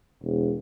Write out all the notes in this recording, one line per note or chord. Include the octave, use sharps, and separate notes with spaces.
E1